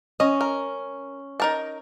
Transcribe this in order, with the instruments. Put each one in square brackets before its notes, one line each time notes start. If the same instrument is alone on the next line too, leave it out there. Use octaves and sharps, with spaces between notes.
[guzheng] C#4 [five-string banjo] D#5
[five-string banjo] A#4
D#4 A#4 A5